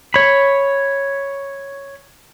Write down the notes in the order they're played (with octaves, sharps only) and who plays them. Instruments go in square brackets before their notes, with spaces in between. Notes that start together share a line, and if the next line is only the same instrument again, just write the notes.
[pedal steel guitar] C#5 B5